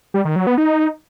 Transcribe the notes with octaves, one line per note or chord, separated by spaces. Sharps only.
G3
D#3
F#3
B3
D#4